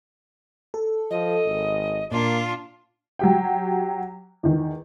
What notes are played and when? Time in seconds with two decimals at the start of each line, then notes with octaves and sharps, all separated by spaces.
0.74 A4
1.10 F3 D#5
1.45 G#1
2.12 A#2 A#3 D4 F4
3.19 F#3 G4 G5
4.43 E2 D#3